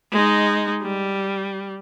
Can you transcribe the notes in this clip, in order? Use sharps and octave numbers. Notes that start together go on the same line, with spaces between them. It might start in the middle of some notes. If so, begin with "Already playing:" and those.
G#3 D#4
G3